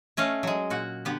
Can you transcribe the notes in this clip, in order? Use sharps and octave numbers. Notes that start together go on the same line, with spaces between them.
A3 C#4 D#5 F5
F#3 G#3
A#2 F#4 F#5
D3 B3 G4